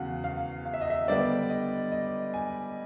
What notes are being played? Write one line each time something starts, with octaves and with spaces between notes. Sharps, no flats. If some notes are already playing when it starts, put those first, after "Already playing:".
Already playing: E2 C#3 F#3 F5 F#5
F5
F5
E5
D#5
E5
D3 G3 B3 D5
D#5
D#5
G#5